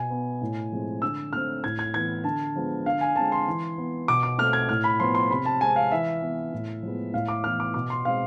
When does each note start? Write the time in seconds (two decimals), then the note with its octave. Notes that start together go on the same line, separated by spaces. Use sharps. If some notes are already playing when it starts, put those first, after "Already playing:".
Already playing: B2 G#5
0.10 B3
0.41 A2
0.72 F3 G#3 C4
1.02 D3 E6
1.33 A3 C4 F6
1.64 A2 G#6
1.79 G#6
1.94 E3 B3 G#6
2.24 D3 A5
2.56 F3 G#3 B3
2.86 D3 F5
3.01 G#5
3.16 G#3 C4 A5
3.32 C6
3.47 E3
3.78 B3
4.08 B2 D6
4.23 D6
4.38 A3 C4 F6
4.53 G#6
4.68 A2 F6
4.84 B5
5.00 F3 B3 C6
5.15 C6
5.30 C3 B5
5.45 A5
5.61 G#3 C4 G#5
5.76 F5
5.92 E3 E5
6.22 B3
6.53 A2
6.82 F3 G#3 B3
7.13 A2 F5
7.28 D6
7.44 E3 B3 F6
7.60 D6
7.74 B2 D6
7.90 C6
8.05 G#3 C4 F5